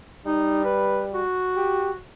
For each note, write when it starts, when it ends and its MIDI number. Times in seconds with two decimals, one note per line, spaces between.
0.26 1.24 55
0.26 0.64 63
0.64 1.03 71
1.14 2.00 66
1.57 1.91 67